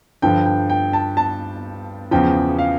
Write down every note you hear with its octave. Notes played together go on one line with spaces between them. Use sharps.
G2 D3 F3 G5
G5
G5
A5
A5
E2 C#3 F3 G5
F5